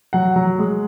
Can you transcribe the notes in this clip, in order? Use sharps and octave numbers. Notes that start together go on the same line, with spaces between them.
F#3 F#5
F#3
G#3